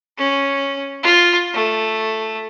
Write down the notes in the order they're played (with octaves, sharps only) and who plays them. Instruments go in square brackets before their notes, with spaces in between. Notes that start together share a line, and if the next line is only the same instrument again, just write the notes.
[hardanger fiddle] C#4
F4
A3